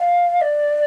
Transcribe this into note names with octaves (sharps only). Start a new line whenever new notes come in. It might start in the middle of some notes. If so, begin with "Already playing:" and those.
Already playing: F5
D5